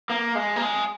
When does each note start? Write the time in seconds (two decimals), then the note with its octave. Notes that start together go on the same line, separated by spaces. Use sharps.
0.10 A#3
0.35 G#3
0.56 A#3
0.62 G#3